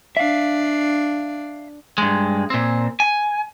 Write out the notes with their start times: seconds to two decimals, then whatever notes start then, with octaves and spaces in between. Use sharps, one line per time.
0.17 D4 E5 F5
1.98 G2 G#3
2.50 A#2 C4
3.00 G#5